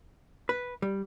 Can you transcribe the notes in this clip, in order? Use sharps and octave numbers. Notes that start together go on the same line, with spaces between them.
B4
G3